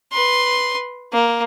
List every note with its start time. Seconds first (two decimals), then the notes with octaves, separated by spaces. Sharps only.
0.13 B4 C6
1.13 A#3